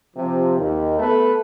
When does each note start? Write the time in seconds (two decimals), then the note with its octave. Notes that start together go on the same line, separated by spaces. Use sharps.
0.16 C3 F3
0.58 D#2
0.99 A3 B3 A4 B4